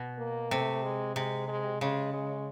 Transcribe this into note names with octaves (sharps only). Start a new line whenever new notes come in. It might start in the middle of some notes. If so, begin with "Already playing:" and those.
Already playing: B2
A#3
C3 A3
G#3
C3 G#3
G#3
C#3 G#3
G#3